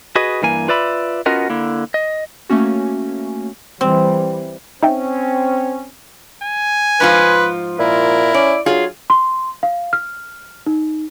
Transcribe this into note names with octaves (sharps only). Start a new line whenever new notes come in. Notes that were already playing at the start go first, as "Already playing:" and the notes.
F#4 G#4 B4 D#5
G2 E3 A#3 G#5
F4 B4 D5 E5 B5
B3 C#4 F4 F#4 A#4 D#5
D3 A#3 E4
D#5
A3 A#3 C#4 F#4
E3 G3 C4
C4 C#4 D#4 E5 G5
G#5
G#2 F3 F4 B4
A#2 E4 A#4
C#4 D5
F#3 F4 G#4 C6
C6
F5
F6
D#4